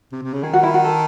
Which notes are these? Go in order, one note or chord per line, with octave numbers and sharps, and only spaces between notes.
C3
C3
C#3
D#3 G#4
F#4
E4
F#4
A4